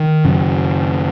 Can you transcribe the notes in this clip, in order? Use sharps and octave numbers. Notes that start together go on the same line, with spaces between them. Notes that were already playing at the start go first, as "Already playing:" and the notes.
Already playing: D#3
F#2 C#3